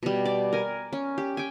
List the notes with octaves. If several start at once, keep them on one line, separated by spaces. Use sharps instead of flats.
B2 G3
D5
A#4 G#5
C#4
G4
G5 G#5